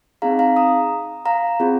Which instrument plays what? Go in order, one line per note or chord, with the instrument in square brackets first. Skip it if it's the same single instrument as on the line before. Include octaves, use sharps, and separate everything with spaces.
[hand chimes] C4 D#4 G#4 F5 A#5
F5 A#5
A#5 D#6
F5 A#5
C4 F4 G#4